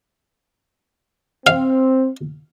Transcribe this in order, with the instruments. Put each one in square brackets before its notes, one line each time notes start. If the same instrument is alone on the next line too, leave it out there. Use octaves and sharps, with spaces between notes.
[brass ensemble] C4 [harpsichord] F5